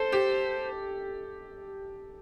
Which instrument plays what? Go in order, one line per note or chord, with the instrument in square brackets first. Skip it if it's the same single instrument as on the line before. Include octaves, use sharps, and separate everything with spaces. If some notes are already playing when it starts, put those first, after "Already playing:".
Already playing: [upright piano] A4 [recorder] C5
[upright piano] G4